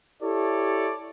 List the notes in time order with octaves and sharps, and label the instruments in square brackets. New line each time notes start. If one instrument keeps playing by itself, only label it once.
[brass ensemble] E4 G4 A4 C#5 D5